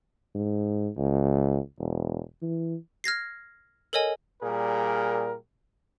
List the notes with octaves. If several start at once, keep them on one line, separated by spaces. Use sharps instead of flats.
G#2
C#2
E1
E3
F6 G#6 A#6 C7
A4 A#4 C#5 D#5 G#5
A#2 G3 G#4 A#4